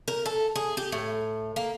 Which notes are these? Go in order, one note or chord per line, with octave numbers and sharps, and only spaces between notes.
A#4
A4
G#4
G4
A2
A#3